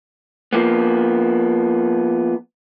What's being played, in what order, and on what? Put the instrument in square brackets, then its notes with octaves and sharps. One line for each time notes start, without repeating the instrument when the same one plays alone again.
[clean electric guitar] F3 A#3 B3